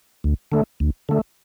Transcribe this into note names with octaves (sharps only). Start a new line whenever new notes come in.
D2
D3 A3
D2
D3 A3